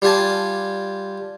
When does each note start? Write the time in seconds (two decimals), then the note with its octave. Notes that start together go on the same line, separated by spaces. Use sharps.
0.02 G3 F4 G4 G#5 A5